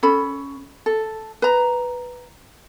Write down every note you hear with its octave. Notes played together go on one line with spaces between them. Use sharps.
C#4 A4 B5
A4
B4 A#5